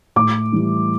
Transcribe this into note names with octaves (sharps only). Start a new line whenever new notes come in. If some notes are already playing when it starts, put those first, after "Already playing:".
A2 D6
E3 G3 E4